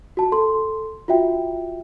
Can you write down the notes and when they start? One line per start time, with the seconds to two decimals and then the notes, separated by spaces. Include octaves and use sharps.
0.17 F#4 A5
0.32 A4 C6
1.08 F4 F#4 E5 G5